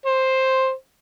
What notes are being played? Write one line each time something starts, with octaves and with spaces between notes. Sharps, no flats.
C5